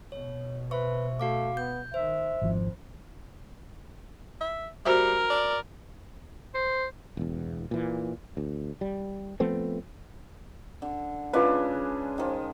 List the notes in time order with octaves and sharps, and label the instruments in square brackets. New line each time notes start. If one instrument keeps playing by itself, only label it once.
[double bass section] B2 [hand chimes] C#5
[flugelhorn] B4 [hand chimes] C5 E5 C#6
[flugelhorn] A3 [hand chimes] F#4 F5 D6
[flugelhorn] B3 [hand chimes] G6
[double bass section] D#3 [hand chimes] C5 [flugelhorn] E5
[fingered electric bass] G#1 F3 [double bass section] F2
[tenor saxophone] E5
[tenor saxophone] G3 [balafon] F#4 C5 E5 [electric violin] A#4
[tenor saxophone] D5
[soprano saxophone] C5
[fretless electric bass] E1 E2
A#2 E3
D2
G3
F3 A3 B3 C4
[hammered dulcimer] D3
[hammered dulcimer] C#3 G#3 D4 [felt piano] F4 B4
[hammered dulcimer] D#3 F3